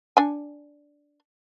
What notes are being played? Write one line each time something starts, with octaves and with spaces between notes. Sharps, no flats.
D4 G#5